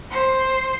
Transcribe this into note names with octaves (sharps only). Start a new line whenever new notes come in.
C5